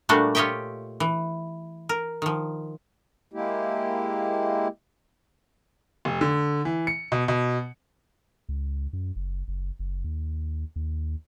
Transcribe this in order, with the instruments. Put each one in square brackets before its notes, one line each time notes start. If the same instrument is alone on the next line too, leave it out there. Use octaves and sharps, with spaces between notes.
[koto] A#2 G3 A3 D4 F#4
F4 G4 C#5 D#5 E5 G5
E3
A#4
D#3 F3
[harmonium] G#3 A#3 E4 G4
[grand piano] F1
D3
E3
C#7
B2
B2
[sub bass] C#2
F#2
F#1
F#1
F#1
D#2
D#2